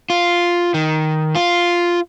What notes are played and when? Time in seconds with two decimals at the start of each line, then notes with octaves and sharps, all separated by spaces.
0.10 F4
0.74 D#3
1.35 F4